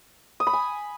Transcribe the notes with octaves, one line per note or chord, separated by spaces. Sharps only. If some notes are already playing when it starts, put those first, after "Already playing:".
D#6
B5
G#5